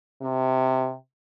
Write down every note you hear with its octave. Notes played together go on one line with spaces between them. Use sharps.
C3